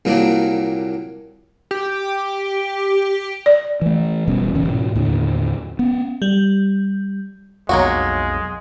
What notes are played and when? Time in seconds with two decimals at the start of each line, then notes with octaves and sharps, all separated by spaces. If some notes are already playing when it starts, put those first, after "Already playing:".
0.05 C2 A#2 F#3 A#3 D4
1.71 G4
3.46 D5
3.82 E3 A3
4.27 E1 B2 G3 C#4
4.55 D1 C#3 E3 C#4
4.68 A1 G#2 B2
4.95 D#2 A2 D3 D4
5.79 B3 C#4
6.22 G3
7.69 B1 F2 F#3 G#3 A#3 F#4